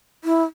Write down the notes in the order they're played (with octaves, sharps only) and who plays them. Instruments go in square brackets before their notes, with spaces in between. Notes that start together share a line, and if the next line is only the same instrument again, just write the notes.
[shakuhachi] E4